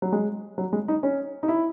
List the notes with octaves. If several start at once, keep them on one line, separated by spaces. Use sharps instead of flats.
F#3
G#3
F#3
G#3
D#4
C#4
D#4
E4